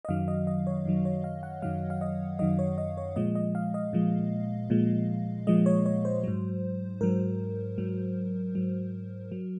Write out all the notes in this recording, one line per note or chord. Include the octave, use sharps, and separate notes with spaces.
D#5
F#2 D#3 F#3 F5
D#5
D#5
C#5
F#2 D#3 F#3
C#5
F5
F#5
F#2 D#3 F#3 F5
F5
D#5
F#2 D#3 F#3 D#5
C#5
D#5
C#5
A#2 F3 G#3 D#5
D#5
F5
D#5
A#2 F3 G#3
A#2 F3 G#3
A#2 F3 G#3 D#5
C#5
C#5
C5
G#2 F#3
G#2 F#3 A#4
G#2 F#3
G#2 F#3
F#3